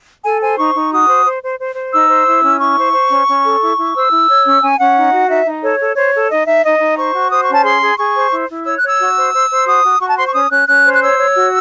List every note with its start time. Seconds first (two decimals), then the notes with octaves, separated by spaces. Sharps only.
0.24 A4 G#5
0.41 C5 G#5
0.58 D#4 C#6
0.74 D#4
0.91 F#4 D#6
1.08 C5
1.25 C5
1.43 C5
1.59 C5
1.76 C5
1.93 D#4 E6
2.09 C5
2.27 E4
2.43 C#4
2.60 E4 C#6
2.77 C5
2.93 C5
3.10 C#4
3.27 C#4
3.44 A4
3.61 E4
3.78 E4
3.95 C5 E6
4.12 E4
4.29 C#5
4.46 C#4
4.61 C#4 G#5
4.79 C#4 F#5
4.96 D#4
5.13 F#4
5.29 D#4 E5
5.46 D#4
5.63 A4 C#5
5.80 A4
5.96 C5 C#5
6.14 A4
6.30 D#4 D#5
6.47 D#4 E5
6.63 D#4 D#5
6.80 D#4
6.97 C5 C#6
7.14 F#4
7.31 C5 D#6
7.43 C#6
7.48 C#4 A5
7.65 G#4 C6
7.82 G#4
7.98 G#4 C#6
8.15 C5
8.33 E4
8.49 E4
8.65 C#5 E6
8.77 F#6
8.82 C#5
8.88 E6
9.00 F#4
9.17 C5
9.33 C5
9.50 C5
9.66 F#4 D#6
9.83 F#4
10.00 F#4 C#6
10.09 A5
10.17 C5 C6
10.26 C#6
10.33 C#4 D#6
10.51 C#4 F#6
10.67 C#4 F#6
10.85 C5
10.94 F#6
11.01 C#5 E6
11.17 C#5
11.35 F#4